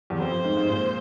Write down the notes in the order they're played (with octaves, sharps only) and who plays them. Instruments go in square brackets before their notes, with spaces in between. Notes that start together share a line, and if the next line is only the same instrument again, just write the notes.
[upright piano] E2
[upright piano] F2 [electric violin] C5
[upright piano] F2
G#2
G#2
A#2